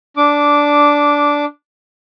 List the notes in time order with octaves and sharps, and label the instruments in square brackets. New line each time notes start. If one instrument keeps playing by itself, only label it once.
[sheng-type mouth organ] D4 D6